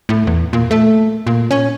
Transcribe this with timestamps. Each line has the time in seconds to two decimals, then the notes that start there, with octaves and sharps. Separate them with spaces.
0.09 A2
0.27 E2
0.53 A#2
0.71 A3
1.27 A#2
1.51 C#4